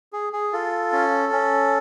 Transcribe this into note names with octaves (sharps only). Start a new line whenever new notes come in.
G#4
G#4
F4 A4
C#4
C#4